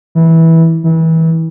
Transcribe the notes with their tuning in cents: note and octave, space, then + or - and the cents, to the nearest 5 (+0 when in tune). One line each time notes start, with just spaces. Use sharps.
E3 -15
E3 -30